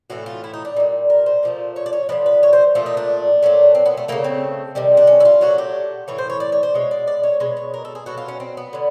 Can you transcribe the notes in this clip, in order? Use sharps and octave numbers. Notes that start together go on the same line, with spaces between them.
A2 E3 A3 F#4
F4
E4
D#4
D4
A#2 G3 D#4
A#4
C5
A#2 F3 A3
C#5
D5
C#5
D3 F3 G#3 B4
B4
C#5
C5
A#2 F3 A3 F4
D#4
D4
A#2 F#3 A3
C4
B3
A3
C#3 F3 A3 A#3
C4
C3 D#3 G3
D4
C#4
E4
F4
A#2 F#3 A3 F#4
G4
A2 E3 C#5
C5
C#5
D5
C#5
C5
B2 G#3 C#5
D5
D5
C#5
B2 G#3 C#5
C#5
A#4
A4
G#4
B2 F#3 A3 F#4
F4
C#4
C4
B3
D3 F#3